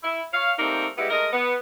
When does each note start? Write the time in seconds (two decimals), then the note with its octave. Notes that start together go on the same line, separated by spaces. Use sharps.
0.04 E4
0.32 C#5 F5
0.59 G3 A3 A#3 C4 D#4
0.97 G3 G#3 B3 E4 G4
1.10 G#3 A3 A#4 D#5
1.32 B3